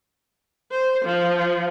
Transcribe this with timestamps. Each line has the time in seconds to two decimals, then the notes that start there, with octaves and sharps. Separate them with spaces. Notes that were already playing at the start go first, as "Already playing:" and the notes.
0.71 C5
1.05 F3